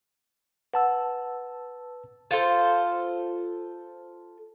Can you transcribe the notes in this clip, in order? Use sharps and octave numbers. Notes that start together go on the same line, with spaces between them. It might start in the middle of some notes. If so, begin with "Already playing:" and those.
B4 F#5 A5 E6
F4 A4 C5